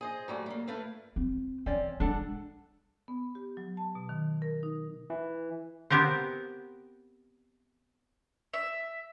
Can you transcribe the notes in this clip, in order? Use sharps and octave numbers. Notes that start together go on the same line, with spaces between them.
G#4 C5 D#5
F#3 G3 A3
G3 A#3
A3 E4 B4 F5
C4
E3 C4 C#4 D5
G#3 D4 A4 F#5
B3
G4
F#3
A5
B2
D#3
A#4
D#4
E3
B3 C4 G4 A#4 C5
E5